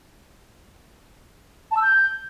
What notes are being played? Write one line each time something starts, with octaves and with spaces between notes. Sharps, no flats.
A5
E6
G6